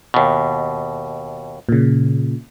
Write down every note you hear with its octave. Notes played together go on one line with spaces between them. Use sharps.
D#2 B2
A#2 C#3